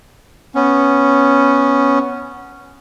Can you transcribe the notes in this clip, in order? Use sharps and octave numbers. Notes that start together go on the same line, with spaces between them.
B3 C#4